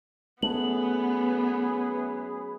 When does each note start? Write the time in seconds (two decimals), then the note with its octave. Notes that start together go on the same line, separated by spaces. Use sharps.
0.43 F#2 A3 B3 G#4 B4 F#7